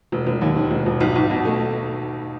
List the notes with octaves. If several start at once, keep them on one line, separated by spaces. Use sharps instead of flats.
E1
E1
D#2
D#3
E1
E1
B1
B1
B2
A3